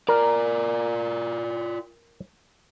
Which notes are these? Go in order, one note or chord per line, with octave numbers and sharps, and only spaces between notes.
F4 A#4 D5